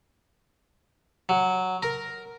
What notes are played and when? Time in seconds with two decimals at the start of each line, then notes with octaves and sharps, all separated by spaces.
1.29 F#3
1.83 A#4